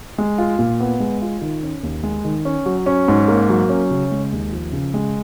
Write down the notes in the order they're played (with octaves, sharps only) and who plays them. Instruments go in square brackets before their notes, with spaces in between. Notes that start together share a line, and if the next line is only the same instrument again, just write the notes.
[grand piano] G#3
F4
A#2
B3
G#3
F4
D#3
C#4
D#2
G#3
D#3
C#4
F#3
C#4
G#2
A#3
F#3
C#4
C#3
G#3
D#2
F3
C#3
G#3